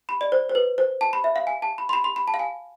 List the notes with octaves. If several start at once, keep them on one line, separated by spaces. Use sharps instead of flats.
B5
D5
C5
C5
B4
C5
A5
B5
E5
F5
G#5
A5
B5
C6
B5
C6
B5
A5
F5
G#5